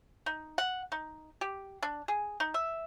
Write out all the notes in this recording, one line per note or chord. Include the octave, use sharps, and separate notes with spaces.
D#4
F#5
D#4
G4
D4
G#4
D#4
E5